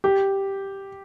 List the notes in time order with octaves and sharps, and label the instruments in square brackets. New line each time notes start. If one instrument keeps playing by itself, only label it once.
[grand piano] G4